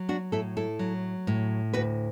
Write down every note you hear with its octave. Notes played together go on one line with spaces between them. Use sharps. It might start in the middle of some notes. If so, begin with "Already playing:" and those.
Already playing: F#3
D4 F#4
A2 E4 A4
E4 A4
F#3
A2
D2 F#4 B4